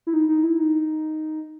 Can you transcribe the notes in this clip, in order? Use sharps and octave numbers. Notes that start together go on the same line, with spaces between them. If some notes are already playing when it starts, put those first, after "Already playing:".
E4
D#4
D#4
E4
D#4